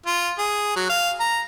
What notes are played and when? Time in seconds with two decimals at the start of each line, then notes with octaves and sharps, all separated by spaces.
0.06 F4
0.39 G#4
0.76 F#3
0.89 F5
1.20 A#5